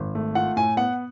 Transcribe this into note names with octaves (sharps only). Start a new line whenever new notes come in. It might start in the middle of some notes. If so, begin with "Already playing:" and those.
Already playing: G#1
A3
F4 F#5
A2 G#5
B3 F#5